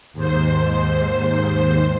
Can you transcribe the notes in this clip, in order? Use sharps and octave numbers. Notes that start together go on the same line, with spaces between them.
D#2 G#2 C5